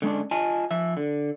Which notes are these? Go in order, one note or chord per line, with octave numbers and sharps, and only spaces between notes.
D3 G#3 C#4 D4
F4 D#5 G#5 A5
F3 E5
D3